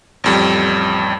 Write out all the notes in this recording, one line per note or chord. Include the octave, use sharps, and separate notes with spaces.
A1 F2 G3